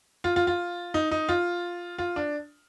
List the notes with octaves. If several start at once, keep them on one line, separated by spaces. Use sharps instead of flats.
F4
F4
F4
D#4
D#4
F4
F4
D4